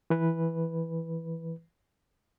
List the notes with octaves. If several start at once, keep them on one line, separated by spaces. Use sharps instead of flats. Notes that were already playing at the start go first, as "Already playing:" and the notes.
E3 B4